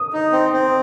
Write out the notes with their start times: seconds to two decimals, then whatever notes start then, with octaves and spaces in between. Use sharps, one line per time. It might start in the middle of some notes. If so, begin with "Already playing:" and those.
Already playing: D#6
0.13 D#4
0.32 C4
0.53 C4